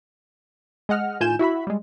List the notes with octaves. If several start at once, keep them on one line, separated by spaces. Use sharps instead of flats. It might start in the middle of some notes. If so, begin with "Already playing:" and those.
G#3 D#5 F#5 F6
A2 D#3 F4 G#5 G6 E7
E4 F#4 E5 B5
G3 G#3